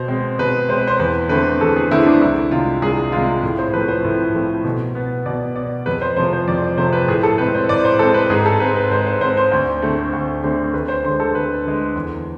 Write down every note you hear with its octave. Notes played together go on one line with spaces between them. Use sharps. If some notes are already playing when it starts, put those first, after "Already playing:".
Already playing: B2 C5
G#3 C4
B2 B4
G#3 C4 C5
B4
C5
E2 B4
D3 A3 C4 B4
E2 A4
G#4
D3 A3 C4 E4
D4
C2 E4
C3 G#3 F4
C2 G#4
C3 G#3 F4
A2
C5
F3 A3 C4 B4
C5
A2
F3 A3 C4
B2
B3
B2 D5
B3 D5
F2 B4
C5
C3 F3 A3 C5
C5
F2 D5
C5
C3 F3 A3 C5
B4
A2 G#4
A4
G#3 C4 B4
C5
A2 D5
C5
G#3 C4 A4
B4
G#2 G#4
A4
G#3 C4 B4
B4
G#2 C5
C5
G#3 C4 C5
C5
D2 C5
D3 A3 C4
D2
D3 A3 C4
D2 B4
C5
D3 G#3 C5
A4
D2 B4
D3 G#3
E2